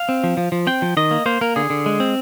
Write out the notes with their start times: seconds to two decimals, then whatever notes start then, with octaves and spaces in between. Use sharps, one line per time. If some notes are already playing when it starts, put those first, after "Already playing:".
Already playing: F5
0.09 C4
0.24 F3
0.37 F3
0.52 F3
0.67 C4 G5
0.82 F3
0.97 D#3 D#5
1.11 A#3
1.26 A#3 C5
1.41 A#3 A#4
1.56 D3 G#4
1.70 D3
1.86 G#3
2.00 C4